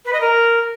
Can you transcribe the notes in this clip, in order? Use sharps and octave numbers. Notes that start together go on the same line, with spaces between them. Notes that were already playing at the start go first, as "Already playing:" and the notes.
B4
D#5
A#4